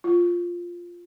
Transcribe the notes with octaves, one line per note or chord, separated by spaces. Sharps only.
F4